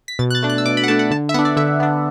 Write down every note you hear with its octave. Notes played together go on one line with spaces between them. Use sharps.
B6
B2 A6
F#6
A6
A3 D4
F#6
E6
B2 D6
B5
F#5
A3 D4 A5
F#5
D3 A5
E5
B3 D4 F#5
D5
D3 E5
B3 D4